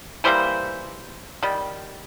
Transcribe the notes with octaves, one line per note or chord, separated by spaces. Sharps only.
E3 G3 A#3 C5
D#3 G3